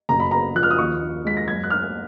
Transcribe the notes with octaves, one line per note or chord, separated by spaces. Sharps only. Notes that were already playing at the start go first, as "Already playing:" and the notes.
F#1 A#5
B5
B3 A#5
F3 F#6
F6
D#6
D#2 C#6
D#4
G#3 B6
A#6
F#2 G#6
F#6
D#4 F6